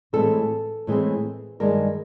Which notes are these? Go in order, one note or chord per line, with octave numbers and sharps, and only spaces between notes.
A2 E3 G#3 C4 A4
A2 E3 G#3 C4
G2 D#3 G#3 A#4